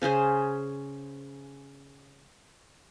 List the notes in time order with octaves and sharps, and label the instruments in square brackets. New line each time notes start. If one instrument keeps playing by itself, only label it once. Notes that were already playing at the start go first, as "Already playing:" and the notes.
[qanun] C#3 C#4 G#4 C5